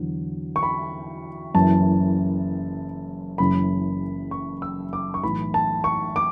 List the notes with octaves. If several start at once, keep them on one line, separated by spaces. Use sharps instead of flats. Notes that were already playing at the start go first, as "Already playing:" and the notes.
Already playing: E2 D3 F#3
C#6
B5
F#1 F#2 E3 A5
F#1 F#2 C#3 E3 B5
C#6
E6
D6
C#6
B1 A2 E3 B5
A5
C#6
D6